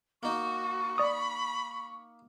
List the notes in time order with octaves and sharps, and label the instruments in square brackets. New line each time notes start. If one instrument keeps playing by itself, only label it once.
[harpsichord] A#3 D#4 [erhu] F#4 [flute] C#6
[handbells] D5 D#6 [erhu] B5